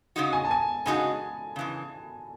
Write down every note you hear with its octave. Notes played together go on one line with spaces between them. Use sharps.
C#3 G#3 D#4 F#4
G#5
A5
G#5
C#3 G#3 D#4 F#4 G#5
C#3 E3 G#3